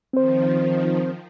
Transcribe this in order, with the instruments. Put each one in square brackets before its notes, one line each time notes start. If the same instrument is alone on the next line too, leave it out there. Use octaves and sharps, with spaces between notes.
[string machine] D#3 F3 [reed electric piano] C4 C5